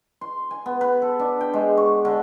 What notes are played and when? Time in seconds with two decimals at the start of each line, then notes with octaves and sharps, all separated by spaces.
0.21 C6
0.51 G#5
0.66 B3
0.81 B4
1.02 A4
1.19 D4
1.41 G5
1.54 G#3
1.77 C#6
2.05 D3